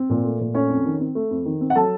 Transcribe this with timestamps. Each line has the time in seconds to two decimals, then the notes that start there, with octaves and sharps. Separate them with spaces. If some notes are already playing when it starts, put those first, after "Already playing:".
Already playing: C4
0.10 A#2
0.24 A3
0.40 A#2
0.54 A3 C#4 C#5
0.70 F2
0.86 D#3
1.00 C4
1.15 A3
1.31 F2
1.46 D#3
1.61 C4
1.70 F#5
1.75 F#3 A4 A5